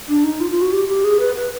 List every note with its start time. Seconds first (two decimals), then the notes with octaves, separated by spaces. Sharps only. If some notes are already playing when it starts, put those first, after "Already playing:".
0.09 D4
0.24 D#4
0.40 F4
0.51 F4
0.62 F#4
0.73 G4
0.88 G4
1.04 G#4
1.20 B4
1.36 B4